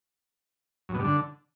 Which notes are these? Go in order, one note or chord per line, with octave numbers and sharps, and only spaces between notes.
F#2
B2
G2
D3